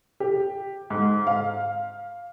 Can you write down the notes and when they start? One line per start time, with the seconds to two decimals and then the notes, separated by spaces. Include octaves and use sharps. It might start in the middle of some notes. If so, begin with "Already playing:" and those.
0.20 G4
0.90 G#2
1.27 F5